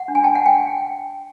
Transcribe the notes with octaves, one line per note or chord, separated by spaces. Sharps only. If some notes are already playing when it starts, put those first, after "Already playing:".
Already playing: F#5
D4
G#5
G5 A5
F#5
G5